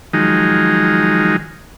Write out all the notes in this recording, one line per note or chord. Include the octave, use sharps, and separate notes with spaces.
D#3 F3 F#3 G#3 D#4